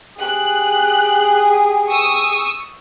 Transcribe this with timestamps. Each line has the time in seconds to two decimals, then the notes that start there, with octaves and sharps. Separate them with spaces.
0.21 G4 G#4 F#6
1.88 C#6 D#6 E6